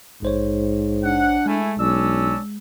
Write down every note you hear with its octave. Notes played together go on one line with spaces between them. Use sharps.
A#1 G#2 C5 C#5
D4 F#5
G#3 A3 E4 G#5
B1 C#4 D4 D5 E6